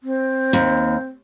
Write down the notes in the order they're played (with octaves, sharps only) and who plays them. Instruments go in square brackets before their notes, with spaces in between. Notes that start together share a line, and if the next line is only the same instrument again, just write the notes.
[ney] C4
[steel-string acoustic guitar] D#2